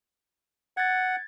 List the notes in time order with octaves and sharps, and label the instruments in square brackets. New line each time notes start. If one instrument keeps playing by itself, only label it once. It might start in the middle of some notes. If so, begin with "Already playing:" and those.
[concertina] F#5 [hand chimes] G#6 A6